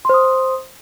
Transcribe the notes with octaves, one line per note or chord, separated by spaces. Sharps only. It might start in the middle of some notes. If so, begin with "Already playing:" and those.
C5 C6 D#6